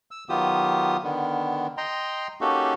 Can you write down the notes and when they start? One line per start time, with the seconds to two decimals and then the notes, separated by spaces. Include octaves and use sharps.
0.11 E6
0.29 D#3 F#3 B3 F4 G4 D#6
1.03 D3 D#3 B3
1.78 D#5 G5 A#5 C6
2.41 A#3 C#4 D#4 F#4 G4 A4